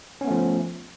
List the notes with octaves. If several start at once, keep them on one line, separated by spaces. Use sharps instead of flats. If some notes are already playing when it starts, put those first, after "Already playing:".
F3 A3 B3 C#4